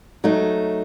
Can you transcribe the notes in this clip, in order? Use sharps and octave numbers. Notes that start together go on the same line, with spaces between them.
F#3 A3 D#4